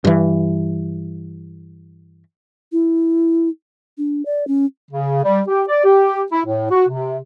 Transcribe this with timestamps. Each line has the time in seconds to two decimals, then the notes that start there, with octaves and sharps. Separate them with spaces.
0.05 G2 E3
2.72 E4
3.98 D4
4.26 D5
4.48 C#4
4.91 C#3
5.23 G3
5.48 G4
5.69 D5
5.85 G4
6.32 E4
6.46 A2
6.71 F#4
6.89 C3